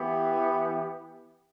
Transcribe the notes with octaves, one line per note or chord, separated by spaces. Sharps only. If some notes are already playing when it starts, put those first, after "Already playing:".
Already playing: E3 B3 G4